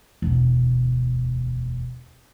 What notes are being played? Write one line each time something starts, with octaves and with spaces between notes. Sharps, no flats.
E1 D2